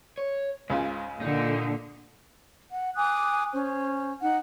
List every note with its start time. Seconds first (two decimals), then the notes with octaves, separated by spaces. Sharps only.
0.18 C#5
0.70 C#2 G#2 C#3 G#5
1.21 A#2 D3 D#4
2.71 F#5
2.96 G#5 D6 D#6 F#6
3.53 C#4 C5
4.22 D#4 F#5